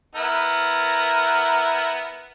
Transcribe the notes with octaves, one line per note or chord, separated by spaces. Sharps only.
B3 E4 A#4